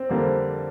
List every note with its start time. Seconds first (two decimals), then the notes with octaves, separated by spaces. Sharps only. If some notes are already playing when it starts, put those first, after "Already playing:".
Already playing: C4
0.09 F2 D3 G3 A#3